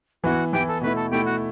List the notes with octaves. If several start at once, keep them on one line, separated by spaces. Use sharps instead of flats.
E3 B3 E4 F#4
E3 B3 E4 G4
A4
B2 A3 E4 B4
A4
B2 A3 E4 G4
F#4